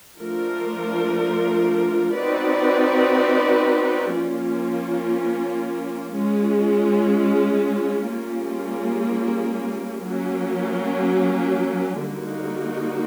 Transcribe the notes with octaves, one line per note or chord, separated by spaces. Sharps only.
F3 A3 D4 F4 A#4
C4 D#4 F#4 B4 D5
F3 A#3 C#4 F4
G#3 C#4 F4
G3 A#3 C#4 F4 G#4
F#3 A#3 C#4
D3 G3 A#3 D#4 F#4